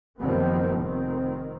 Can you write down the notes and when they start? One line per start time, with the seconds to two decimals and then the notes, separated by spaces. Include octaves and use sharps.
0.19 F#1 D#3 F3 G3 B3 C4
0.80 F1 D#3 C4